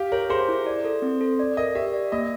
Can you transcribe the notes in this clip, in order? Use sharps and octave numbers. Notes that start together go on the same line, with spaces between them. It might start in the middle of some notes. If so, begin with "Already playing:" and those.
Already playing: G4 F5
A#4 C#5
G#4 C5
E4
D5
A4
C4
A4
D5
A#4 D#5
G4 E5
D5
A#3 D#5